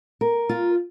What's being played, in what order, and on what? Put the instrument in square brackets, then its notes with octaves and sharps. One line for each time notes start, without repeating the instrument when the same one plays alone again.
[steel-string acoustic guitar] A#4
F4